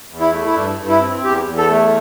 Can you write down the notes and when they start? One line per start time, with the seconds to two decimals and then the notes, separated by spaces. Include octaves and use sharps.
0.09 E2
0.20 E4
0.32 A3
0.46 E4
0.55 G2 D4
0.78 G2
0.89 E4
1.00 C4
1.24 E2 G4
1.46 E2
1.58 A4
1.70 A3